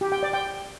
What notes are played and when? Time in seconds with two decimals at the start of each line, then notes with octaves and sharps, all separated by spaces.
0.01 G4
0.12 G5
0.23 D5
0.33 G5